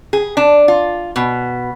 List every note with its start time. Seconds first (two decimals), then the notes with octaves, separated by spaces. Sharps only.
0.13 G#4
0.37 D4
0.68 F4
1.16 B2